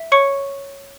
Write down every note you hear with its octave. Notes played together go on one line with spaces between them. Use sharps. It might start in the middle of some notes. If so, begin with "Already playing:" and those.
Already playing: E5
C#5 C#6 C#7